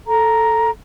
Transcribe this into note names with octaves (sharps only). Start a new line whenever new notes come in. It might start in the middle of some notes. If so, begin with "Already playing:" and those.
A4 A#5